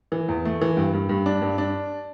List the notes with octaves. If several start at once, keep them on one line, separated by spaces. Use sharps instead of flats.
E3
E2
A3
E3
G2
G2
G2
D4
G2
D4